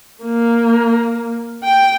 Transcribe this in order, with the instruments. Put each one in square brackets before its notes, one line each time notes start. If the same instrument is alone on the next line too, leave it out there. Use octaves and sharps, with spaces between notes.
[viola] A#3
G5